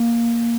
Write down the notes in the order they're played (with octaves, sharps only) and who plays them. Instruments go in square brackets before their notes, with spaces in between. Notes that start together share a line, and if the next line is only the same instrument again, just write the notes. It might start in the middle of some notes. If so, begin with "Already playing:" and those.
Already playing: [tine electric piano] A#3